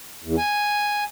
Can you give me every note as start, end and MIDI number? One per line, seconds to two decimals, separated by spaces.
0.24 0.36 40
0.38 1.04 80